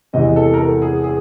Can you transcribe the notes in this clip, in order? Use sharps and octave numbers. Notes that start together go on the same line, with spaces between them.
E2 C3 E3 G#3 D#5
A4
A#4
A4
G#4
G#4